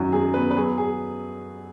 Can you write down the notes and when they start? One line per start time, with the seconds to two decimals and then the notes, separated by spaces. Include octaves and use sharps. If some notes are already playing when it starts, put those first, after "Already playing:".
Already playing: F#2 D#3 F#4
0.12 F#2 G#4
0.34 B3 B4
0.51 B4
0.56 F#3 G#4
0.78 G#4